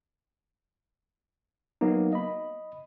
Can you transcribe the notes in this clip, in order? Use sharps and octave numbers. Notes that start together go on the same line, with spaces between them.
F#3 A#3 B3 D#4
D#5 B5